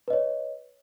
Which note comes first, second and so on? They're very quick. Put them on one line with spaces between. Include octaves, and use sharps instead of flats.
B4 D#5 C#5